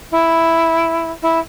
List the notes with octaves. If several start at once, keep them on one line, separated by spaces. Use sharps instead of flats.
E4
E4